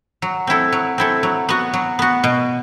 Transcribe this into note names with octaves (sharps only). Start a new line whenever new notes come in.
F#3
C4 E4 A4
F#3
C4 E4 A4
F#3
B3 F#4
F#3
B3 F#4
B2